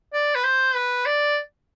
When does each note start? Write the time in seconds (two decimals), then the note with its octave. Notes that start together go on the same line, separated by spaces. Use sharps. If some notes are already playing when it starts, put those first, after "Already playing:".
0.13 D5
0.35 B4
0.44 C5
0.75 B4
1.06 D5